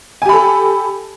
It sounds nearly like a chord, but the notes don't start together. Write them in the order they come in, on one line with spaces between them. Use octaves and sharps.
G#5 G4 B5 A4